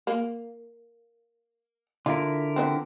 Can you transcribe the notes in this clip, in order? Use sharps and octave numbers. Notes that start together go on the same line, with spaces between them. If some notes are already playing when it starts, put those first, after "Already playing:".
A#3
D3 E4 F4 A#4
F3 B3 C4